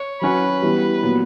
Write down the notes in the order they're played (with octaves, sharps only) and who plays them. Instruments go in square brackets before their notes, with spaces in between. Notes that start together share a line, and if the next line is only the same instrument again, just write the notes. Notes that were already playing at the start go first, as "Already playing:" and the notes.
Already playing: [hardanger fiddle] C#5
[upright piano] F#3 C#4 F#4 [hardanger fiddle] B4
[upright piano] E3 G3 B3
A#2 F#3 B3 F#4